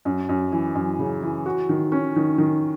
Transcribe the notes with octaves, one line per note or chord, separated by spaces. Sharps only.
F#2
F#2
E3
F#2
C#3
E3
F#4
D#3
C#4
D#3
D#3